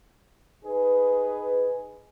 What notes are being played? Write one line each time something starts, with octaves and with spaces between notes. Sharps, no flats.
D#4 G#4 B4